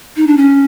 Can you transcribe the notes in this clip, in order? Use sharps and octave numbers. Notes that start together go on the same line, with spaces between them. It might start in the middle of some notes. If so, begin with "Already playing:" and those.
D#4
D4
C#4